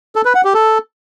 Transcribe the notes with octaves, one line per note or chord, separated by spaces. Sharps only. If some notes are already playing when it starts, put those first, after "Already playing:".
A4
B4
F#5
G4
A4